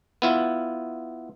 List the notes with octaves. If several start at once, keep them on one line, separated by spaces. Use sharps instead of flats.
B3 E4 F4